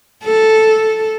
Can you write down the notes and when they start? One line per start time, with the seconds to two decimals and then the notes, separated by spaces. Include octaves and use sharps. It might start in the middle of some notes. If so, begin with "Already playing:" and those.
0.24 A4